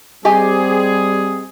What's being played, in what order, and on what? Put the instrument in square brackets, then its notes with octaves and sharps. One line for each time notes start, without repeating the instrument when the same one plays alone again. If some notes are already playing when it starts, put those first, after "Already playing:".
[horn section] G3 C4 G#4 [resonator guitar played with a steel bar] G4 D#5 G#5